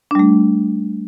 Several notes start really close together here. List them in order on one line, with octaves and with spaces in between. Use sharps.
D4 G3 A3